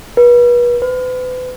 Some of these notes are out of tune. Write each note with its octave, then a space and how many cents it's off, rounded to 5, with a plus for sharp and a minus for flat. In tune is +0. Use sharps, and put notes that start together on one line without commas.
B4 -35
B4 +40